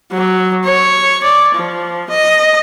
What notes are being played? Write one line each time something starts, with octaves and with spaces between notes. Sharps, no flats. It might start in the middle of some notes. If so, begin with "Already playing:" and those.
F#3
C#5
D5
F3
D#5